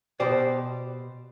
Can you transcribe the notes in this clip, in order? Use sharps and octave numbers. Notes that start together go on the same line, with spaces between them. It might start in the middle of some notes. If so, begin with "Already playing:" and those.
B2 G4 C5 D5